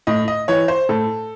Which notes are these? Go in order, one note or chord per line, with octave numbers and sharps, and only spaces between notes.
A2 D#5
D#5
E3 C#5
C5
A2 A4